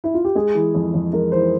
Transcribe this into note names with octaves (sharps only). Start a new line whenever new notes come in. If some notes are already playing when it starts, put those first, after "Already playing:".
E4
F4
G4
G#3 G#4
E3
F2
F2
G#3 A#4
E3 C5